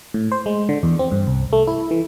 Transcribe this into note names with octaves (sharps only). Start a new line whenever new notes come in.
A2
C5
G#3
D3
E2
C4
G2
C2
A3
E4
E3